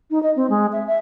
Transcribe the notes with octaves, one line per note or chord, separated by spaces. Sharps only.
D#4
D#5
C4
G#3
E5
E5